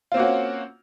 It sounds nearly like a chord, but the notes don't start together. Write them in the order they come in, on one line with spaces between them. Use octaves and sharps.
F4 C4 A#3 F#4 C#4